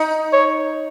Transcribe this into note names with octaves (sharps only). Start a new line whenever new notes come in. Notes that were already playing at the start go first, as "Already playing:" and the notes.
Already playing: D#4
C#5